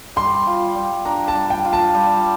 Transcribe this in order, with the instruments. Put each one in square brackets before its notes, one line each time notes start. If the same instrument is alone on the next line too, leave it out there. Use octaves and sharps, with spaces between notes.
[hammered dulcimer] G3 [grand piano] C6
[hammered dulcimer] F4
G3
[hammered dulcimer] D4 [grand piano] A#5
[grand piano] A5
[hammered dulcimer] G3
[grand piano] G5
[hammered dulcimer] F4
[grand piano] A5
[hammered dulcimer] G3